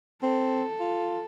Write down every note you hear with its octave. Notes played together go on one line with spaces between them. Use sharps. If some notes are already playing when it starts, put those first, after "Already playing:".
C4 A4
F4